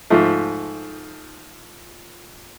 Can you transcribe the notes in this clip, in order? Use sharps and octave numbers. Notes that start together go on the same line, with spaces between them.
G#2 F3 A3